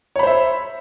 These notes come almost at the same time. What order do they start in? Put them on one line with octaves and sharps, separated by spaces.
C#5 B5 C5 E5